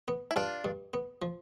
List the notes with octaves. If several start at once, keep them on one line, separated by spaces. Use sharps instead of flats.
B3
E4
G2 D4 F4
G2
B3
F3